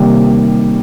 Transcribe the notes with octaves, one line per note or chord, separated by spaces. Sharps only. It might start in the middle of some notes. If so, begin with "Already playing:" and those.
Already playing: C3 D#3 G3 A#3